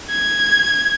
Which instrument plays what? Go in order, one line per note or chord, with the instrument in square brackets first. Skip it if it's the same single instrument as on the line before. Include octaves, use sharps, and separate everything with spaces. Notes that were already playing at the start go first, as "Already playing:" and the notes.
[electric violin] G#6